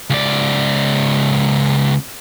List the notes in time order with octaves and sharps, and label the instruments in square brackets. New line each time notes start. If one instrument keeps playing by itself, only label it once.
[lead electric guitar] C#2 D5